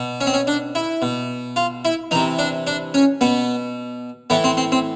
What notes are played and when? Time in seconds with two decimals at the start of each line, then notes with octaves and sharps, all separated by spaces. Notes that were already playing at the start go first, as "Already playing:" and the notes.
Already playing: B2
0.21 C#4
0.27 C4
0.34 C#4
0.47 D4
0.75 E4
1.02 B2
1.56 F4
1.85 E4
2.11 C3 E3 D#4
2.39 D4
2.67 D4
2.94 C#4
3.21 B2 B3
4.30 A2 E3 B3
4.44 C4
4.57 C4
4.72 C4